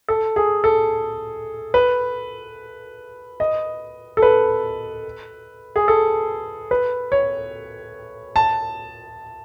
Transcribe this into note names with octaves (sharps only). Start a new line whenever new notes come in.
A4
G#4
A4
B4
D#5
A4
B4
G#4
A4
B4
C#5
A5